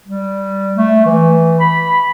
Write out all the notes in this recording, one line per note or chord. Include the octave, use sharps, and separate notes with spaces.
G3
A3
E3
B5